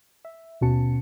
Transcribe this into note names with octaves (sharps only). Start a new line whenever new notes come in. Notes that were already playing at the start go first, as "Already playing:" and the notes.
E5
D#2 B2 C#4 F#4 A5 C#7